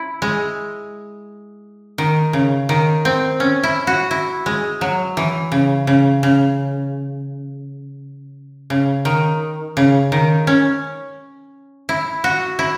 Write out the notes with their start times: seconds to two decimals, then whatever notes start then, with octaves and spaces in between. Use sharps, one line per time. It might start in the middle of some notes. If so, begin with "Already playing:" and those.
Already playing: E4
0.22 G#3
1.98 D#3
2.33 C#3
2.69 D#3
3.05 C4
3.40 C#4
3.63 E4
3.87 F#4
4.11 E4
4.46 G#3
4.81 F#3
5.17 E3
5.52 C#3
5.87 C#3
6.23 C#3
8.70 C#3
9.05 D#3
9.77 C#3
10.12 D#3
10.47 C#4
11.89 E4
12.24 F#4
12.59 E4